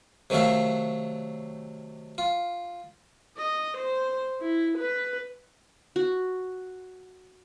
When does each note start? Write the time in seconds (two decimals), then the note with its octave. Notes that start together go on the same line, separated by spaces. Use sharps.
0.30 C3 D#3 F#3 A3 F5
2.18 F4
3.37 D#5
3.77 C5
4.41 E4
4.78 B4
5.96 F#4